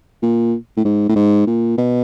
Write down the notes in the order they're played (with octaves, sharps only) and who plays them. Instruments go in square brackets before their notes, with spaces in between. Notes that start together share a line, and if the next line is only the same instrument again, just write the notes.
[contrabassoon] A#2
A2
G#2
A2
G#2
A#2
B2